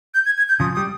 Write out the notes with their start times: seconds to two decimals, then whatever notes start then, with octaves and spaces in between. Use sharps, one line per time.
0.14 G6
0.26 G#6
0.38 G#6
0.49 G6
0.60 C#3 F3 D#6
0.75 G3 D#6